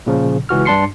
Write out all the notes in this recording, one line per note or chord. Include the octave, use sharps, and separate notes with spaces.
A#2 C#3 F3
C#2 E3 F#4 F6
G2 D4 A5 C6 C7 C#7